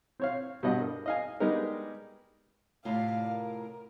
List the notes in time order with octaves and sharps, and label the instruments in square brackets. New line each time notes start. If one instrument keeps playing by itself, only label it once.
[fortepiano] C4 C#5 F5
G2 B2 D#5 F#5
A#4
D#5 F5 G#5
G3 G#3 B3 D#4 G4 A#4
[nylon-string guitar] A2 C3 F4 [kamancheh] D5 F5
[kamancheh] A#4